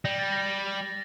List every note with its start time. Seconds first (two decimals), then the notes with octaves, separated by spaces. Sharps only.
0.05 G3 A#6
0.19 A6
0.32 A#6